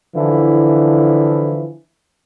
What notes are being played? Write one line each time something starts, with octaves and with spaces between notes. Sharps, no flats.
D3 E3 F3 E4